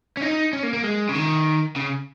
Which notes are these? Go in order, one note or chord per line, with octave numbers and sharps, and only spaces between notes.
C#4
D#4
C#4
A#3
A#3
G#3
C#3
D#3
C#3